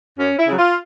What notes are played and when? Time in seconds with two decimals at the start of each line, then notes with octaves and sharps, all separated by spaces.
0.18 F#2 C#4
0.38 E4
0.47 C#3 F#3
0.58 F4